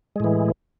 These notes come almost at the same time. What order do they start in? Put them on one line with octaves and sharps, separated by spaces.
G#3 A2 E3